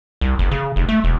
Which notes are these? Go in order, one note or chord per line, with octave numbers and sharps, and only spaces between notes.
C2
F#1
C#3
F1
A3
E1